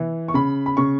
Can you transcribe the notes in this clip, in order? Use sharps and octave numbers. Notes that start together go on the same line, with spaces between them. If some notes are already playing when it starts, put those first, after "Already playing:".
Already playing: E3
C#6
C#3 B5
B5
C#3 C#6